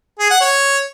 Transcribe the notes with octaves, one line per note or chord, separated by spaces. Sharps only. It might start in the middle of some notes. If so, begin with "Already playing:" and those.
G#4
F#5
C#5